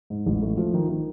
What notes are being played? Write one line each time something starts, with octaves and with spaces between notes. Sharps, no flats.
G#2
A1
A3
F3
D#3
D#3